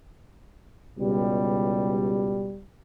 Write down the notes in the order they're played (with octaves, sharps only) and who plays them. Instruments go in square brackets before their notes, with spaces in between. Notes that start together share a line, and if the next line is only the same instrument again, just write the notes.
[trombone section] C#2 B2 G3